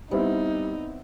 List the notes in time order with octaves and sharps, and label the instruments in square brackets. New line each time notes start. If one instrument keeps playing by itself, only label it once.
[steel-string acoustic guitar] G3 [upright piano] B3 C4 E4 [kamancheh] D#4